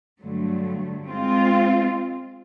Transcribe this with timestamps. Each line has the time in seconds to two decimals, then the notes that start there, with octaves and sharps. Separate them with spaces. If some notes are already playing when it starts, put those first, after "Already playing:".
0.21 G2 D3 F#3 A3
1.10 G#3 C4 F4